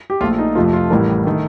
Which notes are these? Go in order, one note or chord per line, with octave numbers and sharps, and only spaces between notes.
G4
A#1 A#2 F3 A3 F4
D#4
F2 C3 F3 A3 F4
F4
A1 A2 G3 A#4
D#3 A3